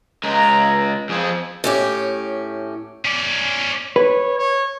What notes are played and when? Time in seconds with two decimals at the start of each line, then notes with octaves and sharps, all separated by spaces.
0.24 C#2 G#3 A#5
1.09 F2 F3 G#4
1.64 A2 C#4 G4
3.05 C#4 D5
3.96 B4 C#5
4.39 C#5